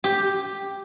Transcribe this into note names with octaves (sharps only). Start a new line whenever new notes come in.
G4